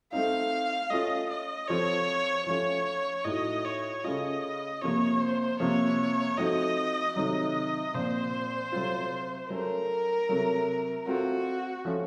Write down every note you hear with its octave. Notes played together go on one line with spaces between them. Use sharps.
A3 C4 D#4 F5
A3 C#4 F4 D#5
D#5
F3 C4 F4 A4 C5 C#5
F3 A3 C#4 F4 C#5
A2 A3 D#4 F#4 D#5
C#5
C#3 A3 C#4 F4 D#5
C3 F3 A#3 C#5
C5
C3 F3 A#3 C#5
F3 A3 C4 D#4 F#4 D#5
C3 D#3 F#3 A3 D#4 D#5
A#2 F3 C4 C5
C3 F#3 A3 C4 F4
F#3 A3 C#4 A4 A#4
C3 F#3 A3
A3 C4 F4 F#4
F3 A3 C#4